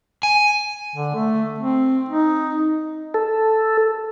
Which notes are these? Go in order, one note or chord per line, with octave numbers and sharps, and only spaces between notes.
G#5
D3
A3
C4
D#4
A4